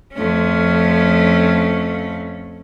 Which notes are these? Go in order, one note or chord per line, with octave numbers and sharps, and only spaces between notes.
F2 A3 C#4